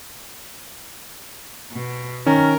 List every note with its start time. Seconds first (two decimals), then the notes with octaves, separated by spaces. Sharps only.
1.72 B2
2.26 D#3 C#4 A#4